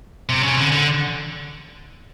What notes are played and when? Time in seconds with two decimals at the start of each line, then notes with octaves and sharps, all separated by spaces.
0.29 C3
0.43 C#3
0.57 D3
0.72 D3